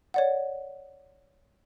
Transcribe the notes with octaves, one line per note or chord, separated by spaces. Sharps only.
C#5 D5 F#5